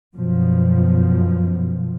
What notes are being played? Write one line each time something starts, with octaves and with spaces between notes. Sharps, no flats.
F#2 B2 F3